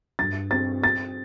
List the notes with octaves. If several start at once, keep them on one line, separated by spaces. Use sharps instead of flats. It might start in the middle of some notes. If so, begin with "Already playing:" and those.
G2 A6
C4 A6
C4 A6